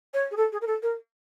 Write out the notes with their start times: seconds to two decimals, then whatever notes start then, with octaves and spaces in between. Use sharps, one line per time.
0.13 C#5
0.31 G#4
0.36 A4
0.52 G#4
0.61 A#4
0.67 A4
0.82 A#4